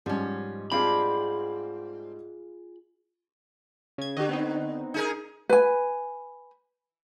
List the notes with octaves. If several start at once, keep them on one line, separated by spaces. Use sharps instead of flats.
G#2 F3 G3 C#4
C4 D4 F4 G#4 F5 B5
C#3 G#6
D3 G4 D#5
B3 C4 D#4
D#4 G#4 A#4
B4 G#5